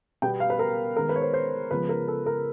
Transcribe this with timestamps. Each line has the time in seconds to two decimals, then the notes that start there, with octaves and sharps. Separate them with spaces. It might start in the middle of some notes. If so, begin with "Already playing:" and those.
0.22 B2 G3 B3 G5
0.40 F5
0.50 B4
0.59 A#4
0.96 D#3 G#3 B3 A#4
1.09 B4
1.16 C#5
1.22 C5
1.33 C5
1.71 C#3 F3 G#3 B3 B4
1.89 A#4
2.08 A4
2.26 A#4